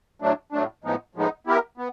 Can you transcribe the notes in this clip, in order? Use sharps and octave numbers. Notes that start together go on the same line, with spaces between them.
A2 F#3 A3 D4
A2 F#3 A3 D4
A2 F3 G#3 B3 D#4
A2 F3 G#3 B3 D#4
B3 E4 G4 A#4
B3